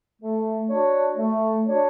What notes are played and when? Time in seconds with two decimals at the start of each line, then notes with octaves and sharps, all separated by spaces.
0.22 A3
0.70 D4 F#4 C#5
1.17 A3
1.64 D4 F#4 C#5